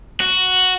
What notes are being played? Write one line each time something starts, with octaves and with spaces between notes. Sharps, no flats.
F#4